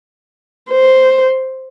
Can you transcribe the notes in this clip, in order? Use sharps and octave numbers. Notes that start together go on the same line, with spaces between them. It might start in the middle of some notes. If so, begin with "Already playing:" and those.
C5